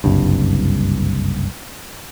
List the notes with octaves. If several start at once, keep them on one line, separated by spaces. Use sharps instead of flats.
F#1 C2 G2